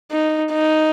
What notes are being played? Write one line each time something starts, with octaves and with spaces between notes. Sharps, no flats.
D#4
D#4